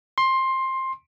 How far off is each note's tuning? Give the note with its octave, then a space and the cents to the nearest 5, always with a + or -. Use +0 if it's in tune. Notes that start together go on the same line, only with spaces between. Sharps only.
C6 +15